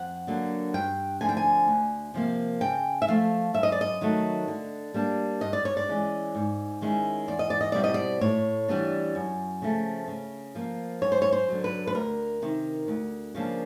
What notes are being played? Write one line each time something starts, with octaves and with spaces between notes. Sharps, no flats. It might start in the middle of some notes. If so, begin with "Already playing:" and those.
Already playing: F2 F#5
D3 F#3 A#3 D4
G2 G5
D3 F3 A3 C4 G#5
G5
G#5
D2
C3 F3 A#3
C#3 G5
E5
F3 A3 F5
F#2 E5
D#5
D5
D#5
D#3 F#3 A3
D3
G3 A#3 D4
G2 D#5
D5
C#5
D5
E3 G#3 C#4
G#2
D#3 G#3 C#4 E4
E2 D5
D#5
D5
D#5
B2 G3 C4 E4 D5
D#5
D5
A2 C#5
E3 G3 B3 D4
F#2
C#3 F3 A3
C#3
F3 A#3
F#2 C#5
C5
C#5
C5
D3 F#3
B4
B4
D2 A#4
C3 D#3
D2
C#3 F3 A#3 D4